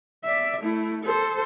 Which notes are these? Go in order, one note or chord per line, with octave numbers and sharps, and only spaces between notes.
D5 E5
A3 E4
A4 C5